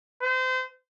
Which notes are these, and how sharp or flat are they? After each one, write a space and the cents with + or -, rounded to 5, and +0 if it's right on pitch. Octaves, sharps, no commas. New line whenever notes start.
C5 -30